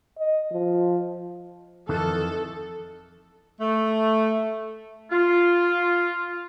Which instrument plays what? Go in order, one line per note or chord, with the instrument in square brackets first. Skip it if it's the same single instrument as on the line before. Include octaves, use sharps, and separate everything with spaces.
[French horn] D#5
F3
[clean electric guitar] F2 D#3 E3 [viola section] A4
[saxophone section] A3
[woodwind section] F4